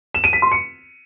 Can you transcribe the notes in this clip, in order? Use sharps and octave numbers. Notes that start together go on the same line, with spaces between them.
E7
D#7
B6
C6
C#7